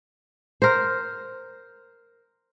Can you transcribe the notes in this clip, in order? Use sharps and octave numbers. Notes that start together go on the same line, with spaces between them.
A#4 C5